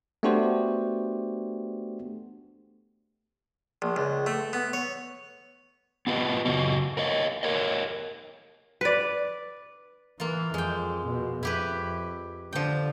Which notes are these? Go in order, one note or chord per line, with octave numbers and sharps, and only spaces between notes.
A3 B3 D4 F#4 G4 C5
A#1
C#2
A3
B3
C#5
B3 F4 G4 A#4 B4 D#5
F#2 C#3 F#4 D#5
A#4 C#5 D#5
A#4 C#5 D#5
B4 D5
E3 A#3 F4
F2 G#3 G5
B2
F2 E4 G4 B4
D3 F3 G5